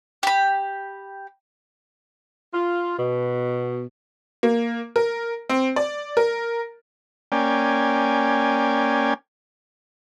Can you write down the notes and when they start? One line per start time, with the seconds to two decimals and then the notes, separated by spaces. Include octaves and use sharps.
0.23 G4 B5
2.53 F4
2.98 B2
4.43 A#3
4.96 A#4
5.49 C4
5.76 D5
6.17 A#4
7.32 A#3 C#4 D5 G5 G#5